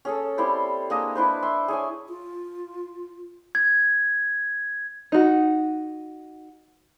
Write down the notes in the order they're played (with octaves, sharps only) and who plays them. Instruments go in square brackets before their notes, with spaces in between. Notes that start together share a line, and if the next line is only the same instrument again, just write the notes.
[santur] C#4 G#4 A4
G3 C4 E4 C5
G#3 A#3 D4 D#5
D4 E4 B4 C5
E5 C6
G#4 C#5 G#5
[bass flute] F4
[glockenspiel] G#6
[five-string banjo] D#4 F#4